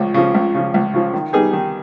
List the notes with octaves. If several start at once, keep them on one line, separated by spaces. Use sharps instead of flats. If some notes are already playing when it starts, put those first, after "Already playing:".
Already playing: C#2 C#3 F3
C#3 F3
C#2
C#3 F3
C#2
C#3 F3
D#3
G3 B3 D#4 G#4
D#3